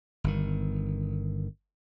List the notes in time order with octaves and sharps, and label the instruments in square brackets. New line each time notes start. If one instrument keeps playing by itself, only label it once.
[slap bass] G1 D#3